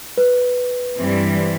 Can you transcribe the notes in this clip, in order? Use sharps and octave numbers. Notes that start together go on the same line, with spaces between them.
B4
G2 E3 G3 C4